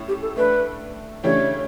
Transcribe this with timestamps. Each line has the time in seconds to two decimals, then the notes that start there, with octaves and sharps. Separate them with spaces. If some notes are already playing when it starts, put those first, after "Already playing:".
Already playing: A2 A3 C#4
0.08 G4
0.22 A4
0.36 A3 D4 A4 B4
1.24 C#3 E3 A3 D4 G4 C#5